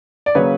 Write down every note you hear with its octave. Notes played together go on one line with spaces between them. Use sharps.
D5
C#3 F#3 A#3 B4 C#5